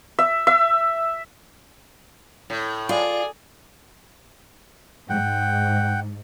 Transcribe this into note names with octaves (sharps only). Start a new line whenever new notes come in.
E5
E5
A2
F4 G#4 D5
G#2 F#5 G5